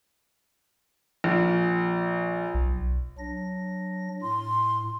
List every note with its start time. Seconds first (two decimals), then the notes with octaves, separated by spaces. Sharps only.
1.24 A#1
2.54 B1
3.18 F#3 D4 A#6
4.22 A2 C6